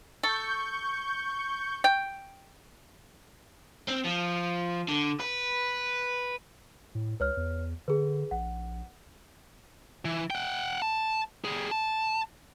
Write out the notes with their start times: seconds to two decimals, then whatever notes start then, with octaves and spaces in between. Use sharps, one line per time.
0.23 A4 C#6 G6
1.84 G5
3.88 C4
4.04 F3
4.88 D3
5.20 B4
6.95 A2
7.20 C#2 B4 C#5 F6
7.37 E2
7.88 D3 G#4 B4
8.31 A#1 F#5
10.05 E3
10.30 F#5 G5
10.82 A5
11.44 G3 G#4
11.71 A5